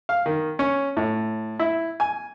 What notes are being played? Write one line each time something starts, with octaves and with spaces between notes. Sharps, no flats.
F5
D#3
C#4
A2
E4
G#5